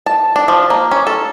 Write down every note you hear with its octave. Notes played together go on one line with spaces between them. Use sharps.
A5
D4
F3
A#3
C#4
A4